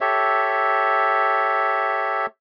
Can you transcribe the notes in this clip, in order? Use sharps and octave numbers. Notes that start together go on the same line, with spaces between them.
G4 A4 C#5 E5